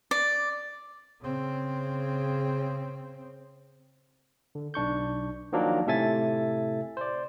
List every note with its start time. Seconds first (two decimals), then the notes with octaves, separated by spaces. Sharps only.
0.11 D5
1.21 C#3 C4
4.55 D3
4.74 B1 D4 C#6 G6
5.52 D#3 F3 F#3 A#3 D4
5.87 A2 C3 A4 E5 G#5 A6
6.97 C5 D5